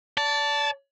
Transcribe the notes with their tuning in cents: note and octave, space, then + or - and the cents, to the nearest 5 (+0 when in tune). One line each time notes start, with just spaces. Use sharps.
D5 -35 A5 +0